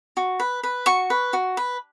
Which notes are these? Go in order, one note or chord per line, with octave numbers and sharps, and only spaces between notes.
F#4
B4
B4
F#4 C#6
B4
F#4
B4